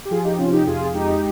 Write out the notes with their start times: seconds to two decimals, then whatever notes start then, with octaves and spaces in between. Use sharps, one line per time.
0.05 G4
0.11 F3 F4 G#4
0.24 D#4 G4
0.38 C3 C#4 F4
0.52 D#4 G4
0.67 F2 F4 G#4
0.94 G#3 D#4 G4